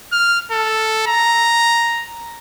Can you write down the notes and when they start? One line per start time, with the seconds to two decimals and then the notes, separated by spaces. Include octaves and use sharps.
0.12 F6
0.51 A4
1.07 A#5